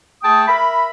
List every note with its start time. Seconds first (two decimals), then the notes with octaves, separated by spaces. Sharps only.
0.22 A3 G#4 G5 A5 D#6
0.47 A#4 E5 B5